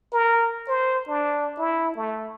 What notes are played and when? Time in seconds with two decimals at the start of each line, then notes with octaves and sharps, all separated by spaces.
0.13 A#4
0.68 C5
1.08 D4
1.58 E4
1.96 A3